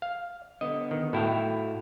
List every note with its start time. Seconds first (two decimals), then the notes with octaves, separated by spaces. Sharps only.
0.02 F5
0.61 D3 B3 D#5
0.91 D#3
1.13 A2 E4 F#4 A4 F5 G5